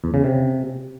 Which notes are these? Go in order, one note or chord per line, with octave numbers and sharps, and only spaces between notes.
E2
C#3
C3